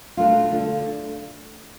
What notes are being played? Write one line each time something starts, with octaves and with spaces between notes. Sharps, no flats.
B2 A3 D4 F4
D3 A3 D4 F4